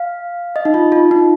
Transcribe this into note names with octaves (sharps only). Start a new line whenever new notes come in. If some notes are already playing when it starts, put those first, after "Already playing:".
Already playing: F5
D#5
D#4
F4
F4
D#4